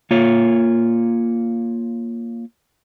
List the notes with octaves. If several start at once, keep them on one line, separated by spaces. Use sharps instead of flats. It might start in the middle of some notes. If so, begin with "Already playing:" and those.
A#3 F4 C#5